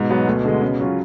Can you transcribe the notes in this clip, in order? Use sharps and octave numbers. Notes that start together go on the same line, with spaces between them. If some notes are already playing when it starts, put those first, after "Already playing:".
Already playing: G#2 B2
F#3 B3
D2
D3 G#3
C#3
F#3 C#4 F4